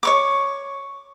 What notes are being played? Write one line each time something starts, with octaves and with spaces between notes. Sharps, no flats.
C#5 C#6 D6